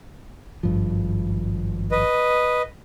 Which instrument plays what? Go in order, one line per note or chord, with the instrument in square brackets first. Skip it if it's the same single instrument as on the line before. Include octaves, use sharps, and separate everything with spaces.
[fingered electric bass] G#1 G2 F3
[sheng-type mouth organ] B4 D#5